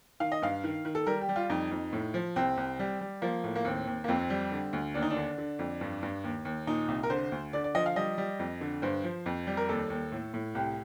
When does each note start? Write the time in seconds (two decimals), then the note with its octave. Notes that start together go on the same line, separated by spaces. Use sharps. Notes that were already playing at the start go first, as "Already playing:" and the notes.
0.20 D#3 F5
0.32 D#5
0.42 G2 F5
0.64 D#3
0.85 D#3
0.95 A4
1.07 G3 A#4
1.21 G4
1.29 G3
1.36 F4
1.50 F2 D#4
1.71 F2
1.93 A2
2.14 F3
2.36 C2 C4
2.57 C2
2.79 G3
3.01 G3
3.22 F3 A#3
3.44 A2
3.56 A#3
3.65 D#2 C4
3.87 D#2
4.04 A#3
4.08 F2 C4
4.30 G3
4.51 D3
4.73 D2
4.94 D#2 D4
5.02 D#4
5.10 D4
5.16 D3
5.38 D3
5.59 F2
5.81 G2
6.03 G2
6.24 D#2
6.45 D#2
6.67 A#2 D#4
6.88 C2
7.03 A#4
7.10 D3 C5
7.32 D2
7.53 D3 D5
7.64 D5
7.75 F3 D#5
7.86 F5
7.96 G3 D#5
8.18 G3
8.39 F2
8.61 D3
8.82 G2 C5
9.04 F3
9.26 F2
9.47 G3
9.57 A#4
9.69 D#2 A4
9.90 D#2
10.12 A2
10.34 A2
10.55 C2 G4